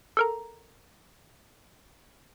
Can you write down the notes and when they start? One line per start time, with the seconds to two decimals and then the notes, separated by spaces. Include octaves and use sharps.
0.17 A4 A#4 A#5